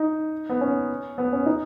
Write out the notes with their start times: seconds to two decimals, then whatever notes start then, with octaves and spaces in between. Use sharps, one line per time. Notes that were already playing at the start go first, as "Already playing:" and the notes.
Already playing: D#4
0.49 B3
0.61 C#4
1.18 B3
1.33 C#4
1.46 D#4